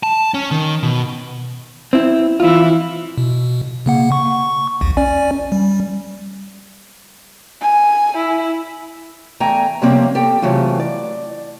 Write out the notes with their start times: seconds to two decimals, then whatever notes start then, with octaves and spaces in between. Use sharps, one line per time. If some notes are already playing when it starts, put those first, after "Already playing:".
0.03 A5
0.34 C#4
0.51 D#3
0.83 B2
1.93 C4 E4
2.40 E3 E4 F4
3.18 B2
3.86 C#3 A#3 F#5
4.12 C#6
4.81 A#1 D#2
4.97 C#4 D5 G#5
5.52 G3
7.61 G#5
8.18 E4
9.40 E2 A3 G5 G#5 A#5
9.82 C3 F3 G3 A#3 C4 C#4
10.15 G4 A4 G5
10.42 C3 E3 F#3 A3 F4
10.80 D5